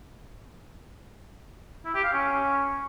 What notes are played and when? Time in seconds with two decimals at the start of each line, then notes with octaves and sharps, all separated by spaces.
1.85 E4
1.94 G4
2.04 F5
2.13 C#4